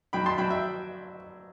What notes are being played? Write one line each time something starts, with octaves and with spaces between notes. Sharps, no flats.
F#3 G5 B5
A5 C6
F#3 G5 B5
E5 G5